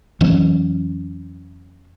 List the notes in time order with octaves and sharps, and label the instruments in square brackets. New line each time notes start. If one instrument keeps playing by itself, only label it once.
[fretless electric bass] F2 E3 F#3 C#4